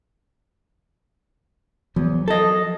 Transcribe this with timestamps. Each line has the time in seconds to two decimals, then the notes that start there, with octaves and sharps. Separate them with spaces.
1.96 E2 F3 F#3
2.28 A4 D#5